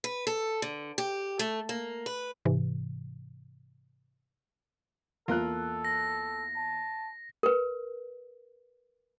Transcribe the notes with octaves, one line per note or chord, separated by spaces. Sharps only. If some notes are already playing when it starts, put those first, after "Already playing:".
B4
A4
D3
G4
A3
A#3
B4
G#2 C3 E3
E2 A#3 F4 A4 A#4 F#6
A#6
A5
A#4 B4